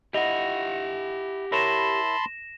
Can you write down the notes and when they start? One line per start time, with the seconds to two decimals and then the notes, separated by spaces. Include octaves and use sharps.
0.14 E4 G4 D#5 F#5 A#6 F7
1.52 E4 A#4 C#5 A5 B5 C6 A#6 E7